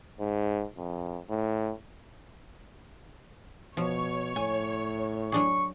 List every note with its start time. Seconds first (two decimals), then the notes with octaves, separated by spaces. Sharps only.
0.20 G#2
0.77 F2
1.30 A2
3.77 B2 F3 C#5
4.36 A2 G#5
5.32 F#3 D4 G#4 C#6